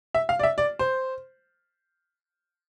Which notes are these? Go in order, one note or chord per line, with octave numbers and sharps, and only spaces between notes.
E5
F5
D5
E5
D5
C5